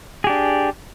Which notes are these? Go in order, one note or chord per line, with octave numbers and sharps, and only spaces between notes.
D4 G4 G#4